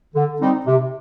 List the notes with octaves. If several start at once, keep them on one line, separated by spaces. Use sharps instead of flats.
D3
G3 C4 D#4
C3